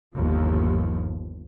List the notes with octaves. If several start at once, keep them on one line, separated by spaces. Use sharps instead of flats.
G1 D#2 F3